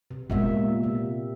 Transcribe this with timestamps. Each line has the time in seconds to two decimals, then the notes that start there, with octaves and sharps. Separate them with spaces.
0.11 C3
0.30 A#2 G#3 A#3 B3 E5
0.83 C3